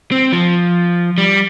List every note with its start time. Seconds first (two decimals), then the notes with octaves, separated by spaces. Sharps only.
0.12 C4
0.32 F3
1.18 G3